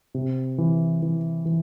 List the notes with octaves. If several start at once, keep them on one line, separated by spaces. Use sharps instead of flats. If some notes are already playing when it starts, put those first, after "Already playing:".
C3
E3
E3
E3